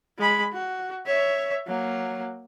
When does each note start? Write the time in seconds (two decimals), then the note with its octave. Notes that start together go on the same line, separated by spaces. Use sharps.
0.18 G#3 B5
0.53 F#4
1.06 C#5 E5
1.67 F#3 A#3